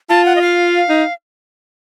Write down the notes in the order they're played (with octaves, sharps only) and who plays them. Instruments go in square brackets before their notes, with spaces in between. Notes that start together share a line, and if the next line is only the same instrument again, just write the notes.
[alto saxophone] F4 [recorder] A5
[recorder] F#5
D#5
F5
[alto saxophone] D#4